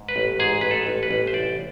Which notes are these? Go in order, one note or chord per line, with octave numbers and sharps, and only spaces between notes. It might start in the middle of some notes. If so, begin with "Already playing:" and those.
Already playing: G#2
B4
A1
G#2 G#4
A1 B4
A4
A1
B4
A1
C5
C2 D5